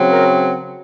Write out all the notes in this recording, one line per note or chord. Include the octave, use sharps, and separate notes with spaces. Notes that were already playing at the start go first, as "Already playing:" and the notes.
Already playing: C#3 F#3 C4
A#4